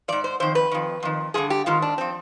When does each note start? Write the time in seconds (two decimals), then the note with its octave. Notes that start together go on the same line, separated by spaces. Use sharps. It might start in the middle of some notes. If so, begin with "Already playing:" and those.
0.08 G#2 F3 D5
0.24 C5
0.40 F2 D#3 C5
0.55 B4
0.72 F2 D#3
1.03 F2 D#3
1.34 G2 D3 F3 G#4
1.50 G4
1.66 G#2 D#3 F4
1.82 D4
1.98 F3 C4